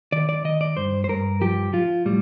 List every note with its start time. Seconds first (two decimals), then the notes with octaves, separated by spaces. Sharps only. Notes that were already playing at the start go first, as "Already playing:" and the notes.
0.12 D#3 D5
0.29 D5
0.44 D#3 D#5
0.61 D5
0.77 G2 C5
1.04 C5
1.09 G2 A#4
1.41 F3 G4
1.73 F3 F4
2.05 A2 G3